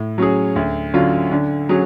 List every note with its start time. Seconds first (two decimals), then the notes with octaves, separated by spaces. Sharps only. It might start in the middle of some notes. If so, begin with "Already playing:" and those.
Already playing: A2
0.18 F#3 C#4 G#4
0.56 D2
0.94 D3 F#3 C#4 F4
1.31 D3
1.69 F#3 C#4 G#4